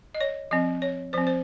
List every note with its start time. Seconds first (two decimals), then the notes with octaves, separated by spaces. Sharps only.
0.15 D#5
0.21 C#5
0.51 F3 C4 D#5
0.82 C#5
1.13 F3 C4 C5
1.27 C5